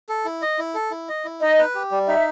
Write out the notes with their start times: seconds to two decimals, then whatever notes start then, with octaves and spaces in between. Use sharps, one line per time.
0.09 A4
0.25 E4
0.42 D#5
0.58 E4
0.74 A4
0.91 E4
1.09 D#5
1.25 E4
1.41 D#4 D#5
1.59 B4
1.75 G4
1.91 G3
2.07 D#4 E5